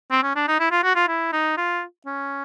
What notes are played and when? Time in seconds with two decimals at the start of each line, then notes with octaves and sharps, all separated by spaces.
0.11 C4
0.23 C#4
0.35 D4
0.48 D#4
0.60 E4
0.71 F4
0.84 F#4
0.95 F4
1.08 E4
1.32 D#4
1.57 F4
2.06 C#4